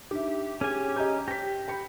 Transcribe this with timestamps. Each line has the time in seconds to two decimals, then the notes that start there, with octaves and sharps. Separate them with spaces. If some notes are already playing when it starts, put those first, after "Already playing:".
0.11 D4 D#4 G4 E5
0.61 C#4 G#4 G#5
0.96 D#5 A#5 G6
1.28 G4 A#6 B6
1.68 G5 B5 C#7